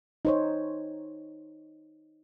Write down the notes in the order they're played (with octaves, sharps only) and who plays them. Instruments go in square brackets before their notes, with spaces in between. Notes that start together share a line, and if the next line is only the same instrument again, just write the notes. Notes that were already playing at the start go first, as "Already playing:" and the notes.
[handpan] D#4 C5 C#5